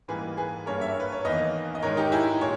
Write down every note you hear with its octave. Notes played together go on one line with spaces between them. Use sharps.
G#2 E3 G3 A#3 G#4 B4
G#4 B4
G2 G3 A#3 A#4 C#5
C#5 E5
B4
C#5
E2 D#3 A#3 B4 D#5
D#5
G#2 D#3 G#3 A#4 C#5
D#4 G4
E4 G#4
A#2 C#5